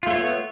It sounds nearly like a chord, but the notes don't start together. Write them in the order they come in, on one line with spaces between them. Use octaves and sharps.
F4 A3 C#5 B3